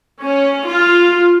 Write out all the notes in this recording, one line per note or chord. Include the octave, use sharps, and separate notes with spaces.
C#4
F4